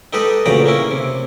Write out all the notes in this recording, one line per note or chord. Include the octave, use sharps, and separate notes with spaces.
D#4 G4 A4 B4 D#5
D2 A#2 C#3 B4 G5 A#5
A#3 C#4 E4
C3